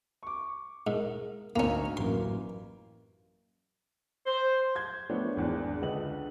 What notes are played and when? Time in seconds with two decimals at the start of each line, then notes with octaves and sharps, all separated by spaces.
0.23 C#6 D6
0.87 G#2 A#4
1.56 G#1 D2 A#3 C#4 A#5
1.97 A1 F#2 A#3 C6
4.27 C5
4.75 G6 G#6
5.09 F3 A3 B3 D4 C#5
5.37 G#1 E2 D4
5.82 C#2 D3 B4 D#5 F#7